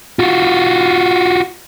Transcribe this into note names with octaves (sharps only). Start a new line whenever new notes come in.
F4 F#4